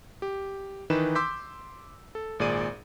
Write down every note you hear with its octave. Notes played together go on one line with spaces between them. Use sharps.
G4
D#3 E3 D#4 B4 E7
C6 D6 E6 G6 B6
A4
G#1 A#2 G#4 D5 D#7